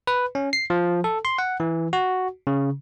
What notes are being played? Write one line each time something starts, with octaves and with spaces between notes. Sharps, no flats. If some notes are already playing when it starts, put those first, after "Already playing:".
B4
C#4
C7
F3
A4
C6
F#5
E3
F#4
C#3